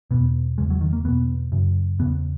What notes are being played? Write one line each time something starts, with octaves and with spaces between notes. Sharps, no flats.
E2 B2 B3
E2 C#3 G#3
F#3
D#3
A#3
E2 B2 B3
F#2 C#3
E2 C#3 B3